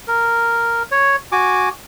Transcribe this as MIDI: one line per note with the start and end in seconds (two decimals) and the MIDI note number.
0.08 0.83 70
0.91 1.16 73
1.32 1.69 66
1.32 1.69 80
1.32 1.69 86